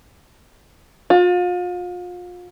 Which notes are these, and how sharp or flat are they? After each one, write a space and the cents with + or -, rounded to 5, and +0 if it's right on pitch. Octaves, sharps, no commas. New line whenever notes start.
F4 +35